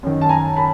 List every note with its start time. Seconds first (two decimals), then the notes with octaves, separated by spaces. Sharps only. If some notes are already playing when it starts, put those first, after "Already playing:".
0.03 F#2 D#3
0.21 A5
0.29 G#5 A#5
0.56 A5 B5